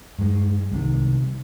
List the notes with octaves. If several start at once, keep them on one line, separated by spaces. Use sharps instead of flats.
G2 G#3
C2 C3 D#3